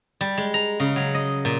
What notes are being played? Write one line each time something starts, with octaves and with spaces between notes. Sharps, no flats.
G3
G#3
A#5
C#3
F#3
D#5
A#2